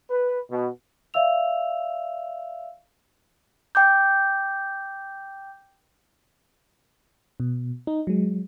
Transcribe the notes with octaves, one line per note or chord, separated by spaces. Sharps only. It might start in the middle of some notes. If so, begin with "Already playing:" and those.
B4
B2
D5 E5 F5 E6 F7
G5 D6 G6
B2
D#4
F#3 G#3